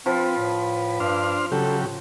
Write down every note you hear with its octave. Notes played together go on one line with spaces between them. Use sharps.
F3 C4 B4
A2
G2 D4 C5 F6
C#3 F#3 G4 A4
A2